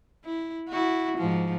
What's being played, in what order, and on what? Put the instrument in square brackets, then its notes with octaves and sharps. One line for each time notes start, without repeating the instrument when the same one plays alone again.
[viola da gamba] E4
E4 F#4
G#2 F3